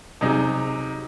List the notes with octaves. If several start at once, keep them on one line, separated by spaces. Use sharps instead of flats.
C3 F#3 D#4 G#4